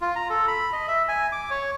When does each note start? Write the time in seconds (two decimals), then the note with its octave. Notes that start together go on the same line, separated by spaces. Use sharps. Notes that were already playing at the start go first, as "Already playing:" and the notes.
0.01 F4
0.16 A#5
0.30 A4
0.48 B5
0.73 D#5
0.88 E5
1.08 G#5
1.32 D6
1.50 C#5